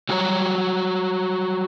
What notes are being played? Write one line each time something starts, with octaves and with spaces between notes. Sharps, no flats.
F#3 G3 F#4 C#5 A#5